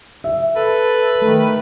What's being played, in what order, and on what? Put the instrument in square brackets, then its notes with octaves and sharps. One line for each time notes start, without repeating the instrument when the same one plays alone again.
[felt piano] E5
[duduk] A4 [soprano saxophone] B4
[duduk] D#3 [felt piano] A3